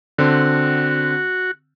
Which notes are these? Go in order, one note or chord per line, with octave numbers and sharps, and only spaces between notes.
D3 C4 F#4